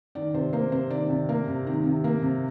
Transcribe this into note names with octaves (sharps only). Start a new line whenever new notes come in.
D#3 D5
C3 C5
A#3 C5
C3 C5
D#3 D5
C3
A#3
C3
D#3
C3
A#3
C3